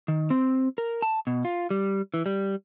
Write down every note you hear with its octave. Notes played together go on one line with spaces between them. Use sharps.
D#3
C4
A#4
A5
B2
F4
G3
E3
G3